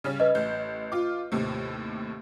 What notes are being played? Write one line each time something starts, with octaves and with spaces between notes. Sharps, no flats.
C#3 G3 C#4
B4 D#5
A1 G6
F4 D6
D#2 A2 C3